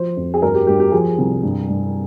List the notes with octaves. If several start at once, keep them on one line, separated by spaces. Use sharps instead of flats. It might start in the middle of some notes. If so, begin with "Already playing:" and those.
Already playing: F3 C5
F2
G#4
G2 A#4
G4
G2 G4
G4
F3 G#4
C2
G2
G2